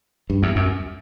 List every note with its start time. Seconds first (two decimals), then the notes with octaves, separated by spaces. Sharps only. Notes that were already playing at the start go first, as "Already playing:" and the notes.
0.30 G2
0.43 E2
0.56 F#2